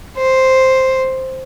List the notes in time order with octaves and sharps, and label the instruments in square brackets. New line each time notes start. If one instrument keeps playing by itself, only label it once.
[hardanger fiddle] C5